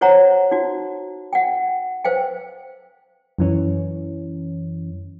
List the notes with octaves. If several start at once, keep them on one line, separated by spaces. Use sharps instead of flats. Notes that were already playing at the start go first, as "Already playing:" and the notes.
F#4 C5 C#5 F#5 A#5
D#4 F#4
F#5 G5
B4 C5 F5 G5
F#2 E3 C#4